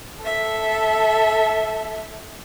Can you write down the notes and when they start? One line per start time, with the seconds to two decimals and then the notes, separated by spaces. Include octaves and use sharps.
0.25 A4 E5